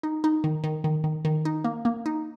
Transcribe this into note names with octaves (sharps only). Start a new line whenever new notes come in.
D#4
D#4
D#3
D#3
D#3
D#3
D#3
D#4
A#3
A#3
D#4